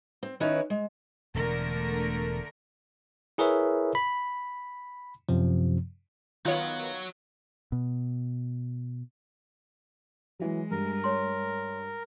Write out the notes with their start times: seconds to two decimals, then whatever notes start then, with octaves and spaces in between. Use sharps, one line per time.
0.23 C4
0.40 D#3 C#4 D#4 E4 B4 C#5
0.70 G#3
1.35 E1 D3 A3 A#4
3.38 E4 G#4 A#4 B4 C#5 E5
3.95 B5
5.29 F#2 C3 F3
6.45 D#3 F#3 B3 F4 F#4 C#5 F#6
7.72 B2
10.39 E3 F#3 G#3
10.71 G2 A#4
11.04 C#5 C6